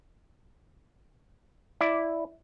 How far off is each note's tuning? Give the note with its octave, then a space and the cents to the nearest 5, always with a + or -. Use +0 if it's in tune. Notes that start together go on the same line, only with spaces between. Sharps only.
E4 +0 D5 +0